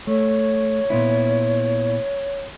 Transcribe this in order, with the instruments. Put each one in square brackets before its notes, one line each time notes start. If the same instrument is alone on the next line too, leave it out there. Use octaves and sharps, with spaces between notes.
[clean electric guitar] A3 [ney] C#5
[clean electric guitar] A#2 B3 E4